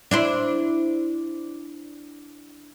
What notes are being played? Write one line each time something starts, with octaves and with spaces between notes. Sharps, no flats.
D4 E4 C5